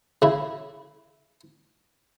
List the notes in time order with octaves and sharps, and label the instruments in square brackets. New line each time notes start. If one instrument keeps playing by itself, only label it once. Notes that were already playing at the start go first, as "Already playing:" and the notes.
[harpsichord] C#3 E4